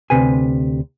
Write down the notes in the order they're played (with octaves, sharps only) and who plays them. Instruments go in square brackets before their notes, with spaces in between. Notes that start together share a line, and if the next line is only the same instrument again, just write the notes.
[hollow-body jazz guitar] D2 C3 B4 G#5